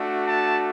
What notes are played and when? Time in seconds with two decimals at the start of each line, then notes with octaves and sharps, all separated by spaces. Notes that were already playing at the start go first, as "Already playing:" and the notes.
Already playing: A3 D4 F#4
0.26 A5